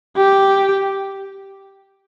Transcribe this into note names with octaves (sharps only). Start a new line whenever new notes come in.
G4